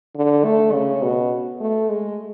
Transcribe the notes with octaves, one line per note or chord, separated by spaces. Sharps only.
D3
A3
C#3
B2
A3
G#3